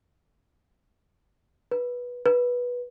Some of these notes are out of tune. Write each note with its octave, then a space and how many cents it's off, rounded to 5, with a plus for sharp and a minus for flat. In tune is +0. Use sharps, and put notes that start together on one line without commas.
B4 -15
B4 -15